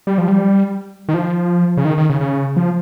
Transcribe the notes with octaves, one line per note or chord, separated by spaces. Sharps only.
G3
F3
G3
D#3
F3
C#3
D#3
D#3
C#3
C#3
F3